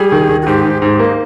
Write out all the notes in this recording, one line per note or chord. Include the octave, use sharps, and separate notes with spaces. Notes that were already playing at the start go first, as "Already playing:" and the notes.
Already playing: G3 G#4
D#3
D#3
F#4
G#2 G4
G#2
G#2 G#4
G4
A#3
D#4